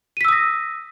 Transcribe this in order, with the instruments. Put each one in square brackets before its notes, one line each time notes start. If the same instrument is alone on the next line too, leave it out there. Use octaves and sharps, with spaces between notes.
[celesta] D#7
B6
E6
D#6
A#6